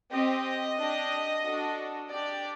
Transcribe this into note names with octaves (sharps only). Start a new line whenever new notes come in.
C4 G4 D#5
D4 G4
D4 F#4 A4
D4 G4 D5